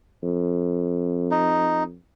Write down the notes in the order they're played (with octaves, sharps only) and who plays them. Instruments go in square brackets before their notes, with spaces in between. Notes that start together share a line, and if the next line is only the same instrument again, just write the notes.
[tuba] F2
[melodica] D#4